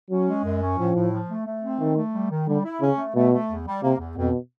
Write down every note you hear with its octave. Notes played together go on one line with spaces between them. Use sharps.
F#3 C#4
G#3
F#2
C#4
A2 F3
A2
F3
A3
A3
C4
D#3 A3
A3
G3
D#3
D3 G3
E4
C#3 C#4
A3
B2 A3
A3
E2
G3
C3 A#3
E2
F2 B2